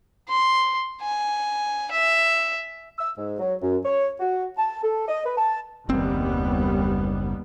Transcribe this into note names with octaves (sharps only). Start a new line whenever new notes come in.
C6
G#5
E5
E6
G#2
F#3
F#2
C#5
F#4
A5
A4
D#5
B4
A5
F#1 D#2 G3 B3 C4